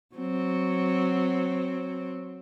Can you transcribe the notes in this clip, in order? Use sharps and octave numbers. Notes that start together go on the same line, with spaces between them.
F#3 C4